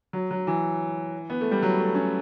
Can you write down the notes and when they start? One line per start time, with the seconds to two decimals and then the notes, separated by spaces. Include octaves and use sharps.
0.13 F#3
0.31 F#3
0.47 E3
1.30 B3
1.41 A3
1.51 G3
1.63 F#3
1.79 A3
1.95 C#4